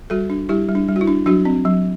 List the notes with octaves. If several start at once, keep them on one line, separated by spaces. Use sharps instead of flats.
G3 F#4 A4
D4
G3 E4 G4
G3
D4
G3
F#4
E4
D4
F#3 D4 F#4
C4
F#3